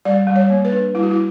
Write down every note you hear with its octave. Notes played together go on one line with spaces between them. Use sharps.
G3 D5
G3
C#5
A#3
B4
D4
G3 E4
F#4
E4